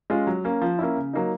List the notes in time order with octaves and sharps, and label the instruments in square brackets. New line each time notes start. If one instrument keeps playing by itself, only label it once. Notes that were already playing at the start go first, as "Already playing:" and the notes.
[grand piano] G#3 C#4 F4
F#3
A#3 C#4
F3
A#3 C#4 E4
C#3
F#3 A#3 D#4